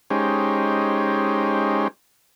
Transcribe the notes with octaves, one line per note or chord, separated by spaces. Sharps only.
G#3 C#4 D#4 G4 C5